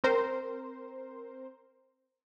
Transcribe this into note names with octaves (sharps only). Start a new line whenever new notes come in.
C4 A#4 C5